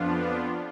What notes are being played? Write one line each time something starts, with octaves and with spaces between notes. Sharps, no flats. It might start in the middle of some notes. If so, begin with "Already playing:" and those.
Already playing: F2 F3 B3 D4 F4